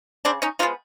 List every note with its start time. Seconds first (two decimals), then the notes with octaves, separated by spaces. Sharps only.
0.25 C#3 C4 D4
0.42 C#4 D#4
0.59 F3 G#3 B3 D#4 F4